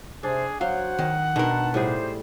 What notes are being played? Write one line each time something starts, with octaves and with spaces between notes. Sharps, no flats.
C3 D4 G#4 C5
F#3 F#4 C5 C#5 F5 F#5
D#3
B2 D#3 D4 A#4 B4 A5
A2 G3 G4 G#4 C5